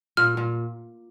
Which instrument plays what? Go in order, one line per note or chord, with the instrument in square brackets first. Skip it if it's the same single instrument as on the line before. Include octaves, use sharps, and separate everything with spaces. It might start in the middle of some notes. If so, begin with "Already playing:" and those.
[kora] A#2 [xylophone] F6
[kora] A#2